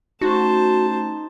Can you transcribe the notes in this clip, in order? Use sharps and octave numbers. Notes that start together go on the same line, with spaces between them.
A3 C#4 D#4 F#4 C5 A5